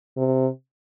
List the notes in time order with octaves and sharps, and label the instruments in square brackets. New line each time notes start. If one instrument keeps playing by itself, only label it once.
[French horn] C3